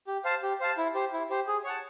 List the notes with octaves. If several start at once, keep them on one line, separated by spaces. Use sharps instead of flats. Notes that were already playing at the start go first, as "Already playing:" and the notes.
G4
C5 F5 A5
G4
C5 F5 A5
E4
G4 C5
E4
G4 C5
G#4
C#5 F#5 A5